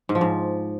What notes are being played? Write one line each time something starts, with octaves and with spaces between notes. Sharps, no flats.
G#2
F3
G#2